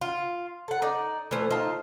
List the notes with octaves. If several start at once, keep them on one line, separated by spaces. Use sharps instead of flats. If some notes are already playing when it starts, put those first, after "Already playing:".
F4
A4 F#5
D#4 D5
E3 F3 A3 C5
D#4 F4 A5